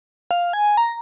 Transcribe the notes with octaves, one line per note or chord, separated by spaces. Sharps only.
F5
G#5
A#5